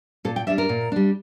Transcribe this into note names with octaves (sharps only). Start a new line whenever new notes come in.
A#2 A4
G5
G3 D4 E5
A#4
A#2
G3 D4